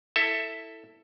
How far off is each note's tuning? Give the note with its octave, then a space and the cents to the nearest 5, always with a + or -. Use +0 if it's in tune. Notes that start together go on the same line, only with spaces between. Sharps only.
E4 +0 A4 +15 E5 +0